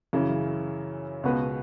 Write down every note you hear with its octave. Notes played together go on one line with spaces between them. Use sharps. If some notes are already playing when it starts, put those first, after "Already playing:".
F#2 C#3 E3
C#2 B2 B3 F#4 B4